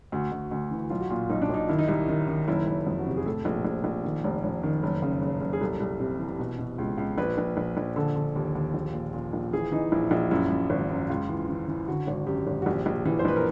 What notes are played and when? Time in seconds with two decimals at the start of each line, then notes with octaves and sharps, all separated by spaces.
0.12 D2 F#4
0.32 D2
0.51 D2
0.71 E3
0.90 B1 F4
1.01 F#4
1.10 A#2 F4
1.29 B1 D#4
1.42 D4
1.49 B1 D#4
1.69 D#3 E4
1.79 D#4
1.88 C2 E4
2.08 D#3
2.27 D#3
2.48 F#1 E4
2.67 F#1
2.87 F2
2.99 F#4
3.06 C3 G4
3.17 G#4
3.26 A2 A4
3.45 A#1
3.65 A#1
3.84 A#1
4.04 D#3
4.24 F1
4.44 F1
4.63 D#3
4.83 F#1
5.02 C#3
5.21 F#1
5.41 F#1
5.53 G#4
5.61 C2 A4
5.80 C2
6.00 C3
6.19 E3
6.39 B2
6.58 B2
6.78 C#2
6.98 C#2
7.18 A#1 B4
7.38 A#1
7.57 A#1
7.77 A#1
7.96 D3 A4
8.16 D3
8.36 D#2
8.55 D#2
8.74 A#1
8.93 A#2
9.13 A#2
9.33 A#1
9.53 E3 G#4
9.72 E3 D#4
9.92 A#1 E4
10.07 D#4
10.11 A#1 E4
10.31 F#2 E4
10.51 F#2
10.70 G#1
10.90 F#2
11.10 C#2 F4
11.29 E3
11.49 E3
11.68 E3
11.88 D3 F#4
12.07 G#1
12.27 F#2 G4
12.47 G#1
12.62 F#4
12.66 A#1 G4
12.86 A#1
13.05 E3
13.19 C5
13.25 A#1 B4
13.36 A#4